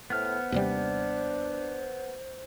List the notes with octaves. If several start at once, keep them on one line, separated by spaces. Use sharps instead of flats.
A2 B3 C5 F6
D#2 C3 G3 D4